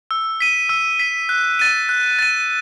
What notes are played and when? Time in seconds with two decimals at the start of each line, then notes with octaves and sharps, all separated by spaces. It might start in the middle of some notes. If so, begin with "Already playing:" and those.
0.11 E6
0.40 B6 D#7
0.69 E6
0.99 B6 D#7
1.29 F#6
1.59 A6 D#7
1.89 F#6
2.19 A6 D#7